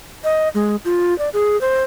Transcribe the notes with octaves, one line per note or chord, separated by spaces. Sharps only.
D#5
G#3
F4
D5
G#4
C5